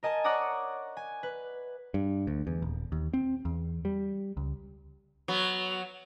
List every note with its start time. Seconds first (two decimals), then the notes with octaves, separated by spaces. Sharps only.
0.03 A#4 D#5 G#5 A5
0.24 C#5 D5 F#5 A#5 D6 D#6
0.97 G#5
1.23 B4
1.94 G2
2.27 D2
2.47 E2
2.62 D#1
2.92 D#2
3.14 C4
3.45 E2
3.85 G3
4.37 C#2
5.28 F#3 B3